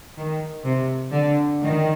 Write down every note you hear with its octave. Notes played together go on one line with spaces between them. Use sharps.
D#3
C3
D3
D#3